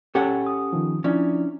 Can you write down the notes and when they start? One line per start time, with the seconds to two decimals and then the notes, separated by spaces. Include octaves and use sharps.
0.15 C#4 G4 A4 F#5
0.46 D#6
0.73 D#3 F3
1.04 F3 C#4 D4 E4 D5